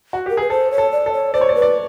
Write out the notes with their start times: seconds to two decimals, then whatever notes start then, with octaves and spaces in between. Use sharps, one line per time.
0.13 F#4
0.26 G4 A#4
0.37 G#4 B4
0.50 A4 C5
0.71 C#5
0.78 A4
0.92 D5
1.06 A4
1.13 C#5
1.34 C5 D5
1.41 C#5
1.49 D5
1.55 B4
1.62 D5